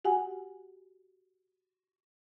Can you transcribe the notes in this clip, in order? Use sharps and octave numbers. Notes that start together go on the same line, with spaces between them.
F#4 G4 F#5 G#5